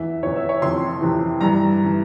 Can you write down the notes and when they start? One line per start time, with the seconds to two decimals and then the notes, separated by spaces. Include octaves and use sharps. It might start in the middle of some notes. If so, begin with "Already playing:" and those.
Already playing: E2 E3 E5
0.23 E2 E3 C#5
0.36 E5
0.49 C#5
0.62 F2 C3 E3 C6
1.01 F2 C3 E3
1.40 G2 E3 A#5
1.84 E3